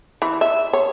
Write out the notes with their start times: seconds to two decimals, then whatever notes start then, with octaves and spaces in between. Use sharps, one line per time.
0.22 E3
0.41 E5
0.73 C#5